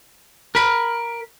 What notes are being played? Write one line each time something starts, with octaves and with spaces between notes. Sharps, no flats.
A#4 B5